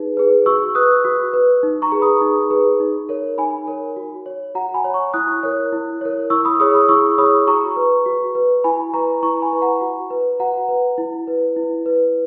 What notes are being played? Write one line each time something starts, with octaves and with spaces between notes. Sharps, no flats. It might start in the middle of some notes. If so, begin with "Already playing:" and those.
Already playing: D#4 G#4 B4
G#4 B4
F#4 C#6 E6
B4 D#6 F#6
F#4
B4
D#4
A#5 C#6
G#4 B4
B5 D#6
D#4
G#4 B4
D#4
A#4 C#5
D#4 G#5 B5
A#4 C#5
F#4
C#5
F#4 F#5 A#5
G#5 B5
C#5
A#5 C#6
E4 D#6 F#6
A#4 C#5
E4
A#4 C#5
E4 C#6 E6
B5 D#6
G#4 C#5 B5 D#6
B5 D#6
E4 C#6 E6
G#4 C#5 B5 D#6
F#4 A#5 C#6
B4
F#4
B4
E4 G#5 B5
B4 A#5 C#6
E4 A#5 C#6
G#5 B5
B4
F#5 A#5
F#4
B4
F#4 F#5 A#5
B4
E4
B4
E4
B4